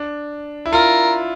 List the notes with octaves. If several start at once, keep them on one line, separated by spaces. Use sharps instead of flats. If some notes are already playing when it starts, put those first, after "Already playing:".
Already playing: D4
E4
F4 A#4